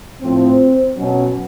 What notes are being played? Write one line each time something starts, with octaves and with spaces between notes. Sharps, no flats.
A2 F3 C4
B2 F#3 C#4